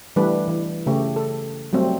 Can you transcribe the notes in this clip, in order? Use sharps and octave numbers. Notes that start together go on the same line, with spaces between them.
E3 G3 A3 D4 B4
E3
C#3 A3 G4
A4
F#3 G3 A3 C4